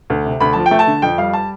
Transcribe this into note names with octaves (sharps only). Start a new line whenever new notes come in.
D2
C3
D2 B5
F3 A5
G5
A3
A5
D3
F2 G5
G3 F5
A5